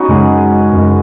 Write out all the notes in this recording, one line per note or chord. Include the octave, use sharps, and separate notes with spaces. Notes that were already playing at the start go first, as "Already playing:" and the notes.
Already playing: B3 C#4 D#4 F#4
F#2 C#3 G#3 G#4
F#2 C#3 G#3